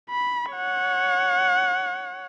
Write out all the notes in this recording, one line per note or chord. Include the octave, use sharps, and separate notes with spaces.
B5
C#5 F#5